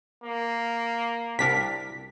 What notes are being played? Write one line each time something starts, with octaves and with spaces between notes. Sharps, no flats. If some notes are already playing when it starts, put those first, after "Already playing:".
A#3
C2 D4 A#4 B6